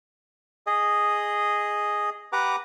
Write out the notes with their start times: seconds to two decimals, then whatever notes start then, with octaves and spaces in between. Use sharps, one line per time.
0.67 G#4 D#5
2.33 G4 B4 F#5 A#5 D6